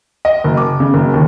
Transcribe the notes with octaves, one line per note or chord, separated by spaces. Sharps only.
D#5
F#1
D6
C#3
F#1
D#2